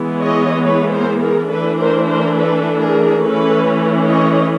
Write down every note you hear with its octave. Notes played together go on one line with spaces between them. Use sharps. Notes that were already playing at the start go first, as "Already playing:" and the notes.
Already playing: E3 G#3 B3
C#5 D#5
B4 C#5
A#4 C5
G#4 A#4
E3 A3 D4 A4 B4
A#4 C5
A#4 C5
A4 B4
G#4 A#4
E3 A3 C#4 A4 B4
C#5 D#5